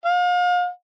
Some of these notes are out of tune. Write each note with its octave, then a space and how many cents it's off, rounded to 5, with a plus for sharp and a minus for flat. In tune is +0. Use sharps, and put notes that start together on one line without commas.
F5 +35